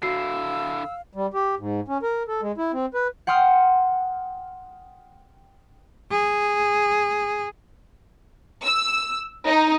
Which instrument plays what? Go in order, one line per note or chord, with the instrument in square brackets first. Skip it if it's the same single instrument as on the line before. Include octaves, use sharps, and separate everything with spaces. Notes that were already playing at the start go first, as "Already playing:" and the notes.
[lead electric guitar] D3 E4 [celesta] F#4 C7 [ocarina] F5 [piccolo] E6
[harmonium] G3
G4
G#2
C#4
A#4
A4
G#3
E4
C4
B4
[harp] F#5 G5 C6 D#6 F6
[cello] G#4
[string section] E6
D#4